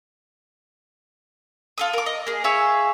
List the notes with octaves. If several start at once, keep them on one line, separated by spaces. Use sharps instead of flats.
F4 A4 D#6
A#4 D6
D#5
A#3 G#4
G#4 C#5 E5 F5